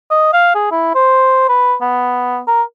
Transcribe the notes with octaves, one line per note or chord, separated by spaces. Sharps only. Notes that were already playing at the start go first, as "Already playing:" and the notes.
D#5
F5
G#4
E4
C5
B4
B3
A#4